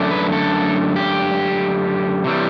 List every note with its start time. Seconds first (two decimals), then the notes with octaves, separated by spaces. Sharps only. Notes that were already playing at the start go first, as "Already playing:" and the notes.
Already playing: F#2 D3 A3 D4
0.11 B4
0.32 A4
0.96 G4
2.24 C3 E3 G3